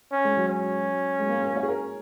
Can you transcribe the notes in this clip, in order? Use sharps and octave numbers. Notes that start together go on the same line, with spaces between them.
C#4
G#3
F#3
C#4
G#3
A#3
G#3
A#3
C#5
G#4
A#4